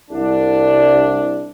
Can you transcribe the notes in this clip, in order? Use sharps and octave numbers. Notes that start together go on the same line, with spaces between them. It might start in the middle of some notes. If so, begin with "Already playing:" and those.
C2 D4